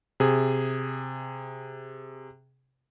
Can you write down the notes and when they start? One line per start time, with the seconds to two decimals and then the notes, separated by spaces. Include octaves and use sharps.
0.20 C3 G#4